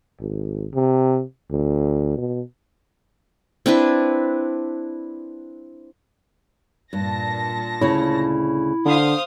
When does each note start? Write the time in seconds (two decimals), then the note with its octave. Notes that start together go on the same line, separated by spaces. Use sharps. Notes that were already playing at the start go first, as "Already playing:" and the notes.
0.20 G#1
0.74 C3
1.51 D2
2.18 B2
3.66 C4 D4 E4 B4
6.93 G2 A#2 A5 A#6
7.81 D2 C#3 E4 C#5
8.85 D3 C5 F5 D#6